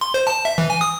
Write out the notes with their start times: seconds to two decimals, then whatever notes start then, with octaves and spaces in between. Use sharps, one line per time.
0.01 C6
0.14 C5
0.27 A5
0.45 E5
0.58 E3
0.70 G#5
0.81 D#6